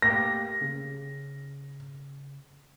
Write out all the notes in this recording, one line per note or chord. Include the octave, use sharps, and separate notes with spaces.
A3 A#3 G4 A#6
C#3